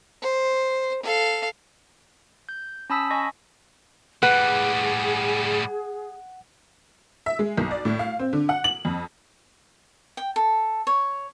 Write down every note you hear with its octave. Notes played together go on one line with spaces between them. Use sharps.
C5
A4 F5
G6
C#4 A5 B5 D#6 E6 B6
D#5 G#5 C#6 A#6
A2 G3 G#4 B4 F#5
E5
G#3
B1
D5
A2
F5
C4
D3
F#5
F#7
F2
G5
A4
C#5